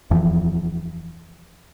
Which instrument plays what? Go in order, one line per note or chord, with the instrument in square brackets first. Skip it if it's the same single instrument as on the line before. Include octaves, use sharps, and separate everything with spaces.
[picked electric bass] D#1 F2 E3 F3